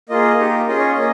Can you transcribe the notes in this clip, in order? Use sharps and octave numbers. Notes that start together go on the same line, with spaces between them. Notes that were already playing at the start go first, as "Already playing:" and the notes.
A#3 F4 G#4 D#5
A#3 D#4 G4
C#4 F4 G#4 D#5
C#5
D#5
A#3 C#4